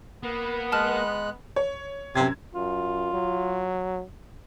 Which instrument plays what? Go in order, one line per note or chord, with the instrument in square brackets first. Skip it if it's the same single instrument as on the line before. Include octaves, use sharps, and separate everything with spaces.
[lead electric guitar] A#3 [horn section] B3
[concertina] G#3 F#6 [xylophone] A5 F6
[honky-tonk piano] C#5
[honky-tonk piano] F#2 G#6 [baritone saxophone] C3
[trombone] F#2 [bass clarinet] F4
[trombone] F#3